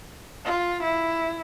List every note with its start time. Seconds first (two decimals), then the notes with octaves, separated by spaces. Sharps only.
0.45 F4
0.83 E4